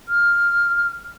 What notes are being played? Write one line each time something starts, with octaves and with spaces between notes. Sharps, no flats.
F6